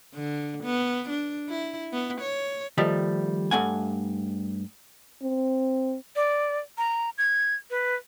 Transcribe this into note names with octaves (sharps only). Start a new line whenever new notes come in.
D3
B3
D4
E4
B3
C#5
D#3 F3 G3 A3
G2 A3 F#5 G#5
C4
D5
A#5
G#6
B4